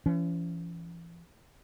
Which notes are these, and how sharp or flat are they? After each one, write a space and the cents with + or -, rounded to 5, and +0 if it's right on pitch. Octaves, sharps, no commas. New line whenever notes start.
E3 +45 C#4 +25